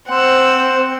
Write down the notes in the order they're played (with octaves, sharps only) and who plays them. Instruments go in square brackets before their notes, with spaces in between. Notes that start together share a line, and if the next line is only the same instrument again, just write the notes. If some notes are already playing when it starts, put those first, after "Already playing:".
[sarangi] C4 [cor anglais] C5 [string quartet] F#5 E6